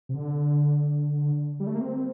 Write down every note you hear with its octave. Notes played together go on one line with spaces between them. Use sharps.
C3
D3
G3
A3
A#3
C4